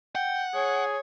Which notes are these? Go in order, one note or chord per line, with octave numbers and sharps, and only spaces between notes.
F#5 G5
G#4 C#5